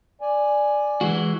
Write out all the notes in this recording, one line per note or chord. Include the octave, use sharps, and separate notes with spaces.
D5 G#5
E3 G#3 F#4